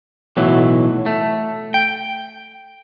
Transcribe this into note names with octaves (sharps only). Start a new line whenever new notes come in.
B1 A2 E3 F#3
A3
G5